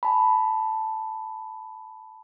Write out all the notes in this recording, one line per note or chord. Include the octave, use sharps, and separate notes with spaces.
G#5 A5 B5